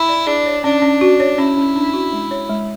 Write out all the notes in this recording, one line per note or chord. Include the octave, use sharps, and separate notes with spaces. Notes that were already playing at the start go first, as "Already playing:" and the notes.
Already playing: E4
D5
D4 G#4
C#5
C#4 D4
C#4
F#4
C#5
C#4 E4
C#4
D4
F#4
G#3
C#5
G#3